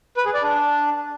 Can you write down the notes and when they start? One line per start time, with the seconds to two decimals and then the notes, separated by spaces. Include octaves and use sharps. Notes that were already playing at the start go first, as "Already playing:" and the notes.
0.17 B4
0.25 G#4
0.34 D5
0.42 D4